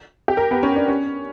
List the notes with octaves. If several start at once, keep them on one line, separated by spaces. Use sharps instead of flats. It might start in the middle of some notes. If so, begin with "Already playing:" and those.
G4
A#4
B3
C#4
D4
C#4